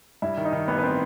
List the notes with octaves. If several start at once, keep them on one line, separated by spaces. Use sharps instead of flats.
G2 E4 E5
D#3
D#4 D#5
D#3
A1 B3 B4
B4
C4 C5